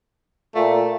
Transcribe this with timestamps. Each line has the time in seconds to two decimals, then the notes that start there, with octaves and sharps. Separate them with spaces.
0.55 A#2 A3